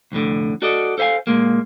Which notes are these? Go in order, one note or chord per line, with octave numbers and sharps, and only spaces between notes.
C2 F2 A2 D3
F#4 A4 D5 D#5
A4 C5 E5 F5 G#5
A#2 G#3 A#3